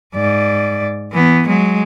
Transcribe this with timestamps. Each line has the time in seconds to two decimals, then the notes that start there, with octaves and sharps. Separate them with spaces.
0.15 G#2 D5
1.13 E3 B3
1.48 F#3 G#3